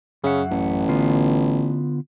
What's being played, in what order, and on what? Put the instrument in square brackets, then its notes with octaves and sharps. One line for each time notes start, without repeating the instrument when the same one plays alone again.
[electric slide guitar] F#2 E5 F#5 [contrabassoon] C#3
[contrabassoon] A1
[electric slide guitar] D3 B3 F4